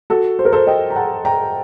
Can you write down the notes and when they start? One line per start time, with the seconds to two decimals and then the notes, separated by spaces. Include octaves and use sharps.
0.10 F#4 A4
0.39 C5
0.45 A#4
0.52 A4 C5
0.67 D#5 G5
0.90 A#5
0.96 F#5 A5
1.25 G5 A#5